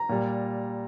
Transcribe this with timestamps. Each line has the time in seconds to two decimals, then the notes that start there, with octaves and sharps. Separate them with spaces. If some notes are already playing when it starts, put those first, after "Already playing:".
Already playing: A#5
0.09 A#2 G3